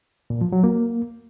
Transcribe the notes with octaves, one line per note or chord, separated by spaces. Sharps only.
A#2
F3
F#3
A#3